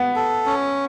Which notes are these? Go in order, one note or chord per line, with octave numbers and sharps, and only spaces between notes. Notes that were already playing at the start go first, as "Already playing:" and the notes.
Already playing: B3
A4
C#4